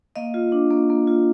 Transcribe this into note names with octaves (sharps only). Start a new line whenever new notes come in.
A#3 D#5 F5
F4
D4
A#3
A#3
F4